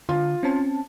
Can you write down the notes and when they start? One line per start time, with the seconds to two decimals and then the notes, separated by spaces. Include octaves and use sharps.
0.09 D3 F4
0.43 C4 C#4 A5